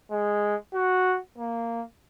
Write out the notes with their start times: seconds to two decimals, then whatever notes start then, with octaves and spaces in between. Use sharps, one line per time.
0.11 G#3
0.74 F#4
1.38 A#3